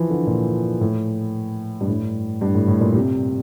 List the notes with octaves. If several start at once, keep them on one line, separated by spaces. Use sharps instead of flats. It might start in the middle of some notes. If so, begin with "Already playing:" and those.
Already playing: E3 F3
D3
A#2
A2
G2
A2
G2
A2
A2
A#2
C3